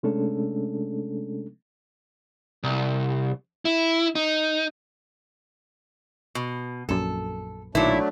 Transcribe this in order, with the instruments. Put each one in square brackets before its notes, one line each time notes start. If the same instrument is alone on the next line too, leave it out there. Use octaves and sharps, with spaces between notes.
[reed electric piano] C3 G#3 A3 C#4 D4 A4
[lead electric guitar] C2
E4
D#4
[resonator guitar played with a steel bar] B2
[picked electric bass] A#1 F#2 [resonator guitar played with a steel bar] A4
[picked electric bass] B1 D#3 [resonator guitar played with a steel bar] A#2 E4 [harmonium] F#3 A3 D4